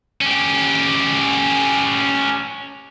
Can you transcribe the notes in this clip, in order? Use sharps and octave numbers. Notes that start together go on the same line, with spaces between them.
C#4 G4